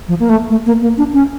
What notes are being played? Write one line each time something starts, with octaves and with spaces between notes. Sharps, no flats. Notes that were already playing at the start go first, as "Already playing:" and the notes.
F3
A#3
A3
A3
A#3
A#3
D4
C#4